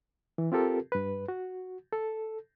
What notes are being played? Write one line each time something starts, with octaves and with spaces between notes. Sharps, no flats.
E3
C4 F4 G4 A4 A#4
G2 B4
F#4
A4